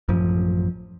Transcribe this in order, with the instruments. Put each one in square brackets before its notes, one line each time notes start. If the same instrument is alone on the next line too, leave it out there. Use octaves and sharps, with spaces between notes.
[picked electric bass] A1 F#2 F3